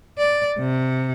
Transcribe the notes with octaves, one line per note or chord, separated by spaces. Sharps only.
D5
C3